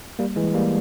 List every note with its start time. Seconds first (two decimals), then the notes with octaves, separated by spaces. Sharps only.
0.19 G3 A#3
0.36 E3 G#3
0.54 G3 A#3